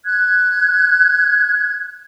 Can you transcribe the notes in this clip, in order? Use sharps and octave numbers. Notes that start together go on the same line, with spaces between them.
F#6 G#6